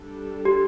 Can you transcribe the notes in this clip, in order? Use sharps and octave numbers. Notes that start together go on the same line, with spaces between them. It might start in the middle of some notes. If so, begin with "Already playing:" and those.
Already playing: G3 D4 A4
G4